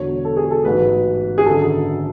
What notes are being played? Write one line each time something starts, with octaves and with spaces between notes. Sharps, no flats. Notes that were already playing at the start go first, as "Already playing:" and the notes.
Already playing: E1 E2 D3 F#3 C#5
A4
G#4
A4
A1 G#2 F#3 B4
G#4
G#1 F#2 D3 A4